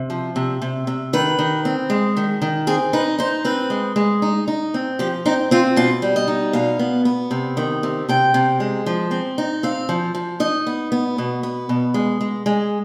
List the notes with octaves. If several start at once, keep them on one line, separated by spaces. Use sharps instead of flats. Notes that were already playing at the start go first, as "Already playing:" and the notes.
Already playing: C3
F3
C3
C3
C3
D#3 B4
D#3
C4
G#3
D#3
D#3
C4 G#4
D#4 B4
D#4 C5
C4 B4
G#3
G#3
D#4
D#4
C4
F3 G4
C4 D#4
C4 F4
B2 F4
G3
D#5
D#4
B2 F5
B3
B3
C3
D#3
C3
C3 G5
C3
G#3
F3
C4
D#4
C4 F5
F3
F3
D#4 D#5
B3
B3
B2
B3
B2
G#3
G#3
G#3